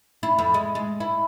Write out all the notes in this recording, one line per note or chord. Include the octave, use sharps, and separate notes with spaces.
E4
F2
G#3
G#3
E4